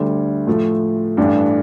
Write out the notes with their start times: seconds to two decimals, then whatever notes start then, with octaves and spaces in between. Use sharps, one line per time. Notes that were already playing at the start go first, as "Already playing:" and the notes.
Already playing: D2 D3 G3
0.47 A2 F3 A3
1.17 A1 G2 E3 A3 D4